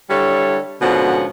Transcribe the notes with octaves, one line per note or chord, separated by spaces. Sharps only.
D3 G3 E4 C#5
G#2 B2 D3 F3 C#4 F#5